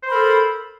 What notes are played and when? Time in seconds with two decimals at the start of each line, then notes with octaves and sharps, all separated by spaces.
0.03 C5
0.07 B5
0.11 A#4
0.15 A4